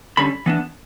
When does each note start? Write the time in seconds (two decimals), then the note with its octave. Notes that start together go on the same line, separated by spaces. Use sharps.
0.17 D3 G3 C#4 B5
0.46 E3 B3 D4